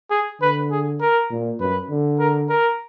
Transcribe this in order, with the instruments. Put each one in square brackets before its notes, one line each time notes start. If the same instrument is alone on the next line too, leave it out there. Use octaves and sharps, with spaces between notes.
[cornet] G#4
[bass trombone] D3 [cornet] B4
[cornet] G#4
A#4
[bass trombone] A#2
[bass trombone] F#2 [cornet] B4
[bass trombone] D3
[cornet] A#4
A#4